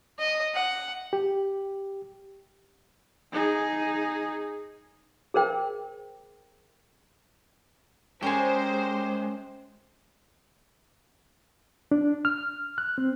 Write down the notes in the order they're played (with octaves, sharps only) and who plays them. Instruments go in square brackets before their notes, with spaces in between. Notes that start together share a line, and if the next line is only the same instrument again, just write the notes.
[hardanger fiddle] D#5
F#5
[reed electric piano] G4
[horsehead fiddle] D#4 G#4
[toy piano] G#4 A#4 C5 G5
[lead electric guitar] G#3 [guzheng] C#4 A#4 D5 [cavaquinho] G4 G#4 [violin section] C5
[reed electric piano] D4
F6
F#6
C4